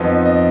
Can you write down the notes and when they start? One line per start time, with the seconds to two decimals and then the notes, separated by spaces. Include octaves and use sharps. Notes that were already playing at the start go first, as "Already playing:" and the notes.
Already playing: F2 F3 B3 D#4
0.25 D#5